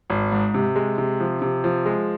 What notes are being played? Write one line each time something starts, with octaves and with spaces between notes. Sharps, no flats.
G#1
G#2
C3
G#3
C3
F3
C3
F3
G#3